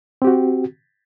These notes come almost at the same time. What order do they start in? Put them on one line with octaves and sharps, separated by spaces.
C4 G4 F#4